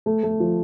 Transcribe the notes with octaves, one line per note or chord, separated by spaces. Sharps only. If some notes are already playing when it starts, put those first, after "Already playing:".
A3
A3
F3